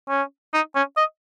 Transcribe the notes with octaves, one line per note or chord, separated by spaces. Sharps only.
C#4
D#4
C#4
D#5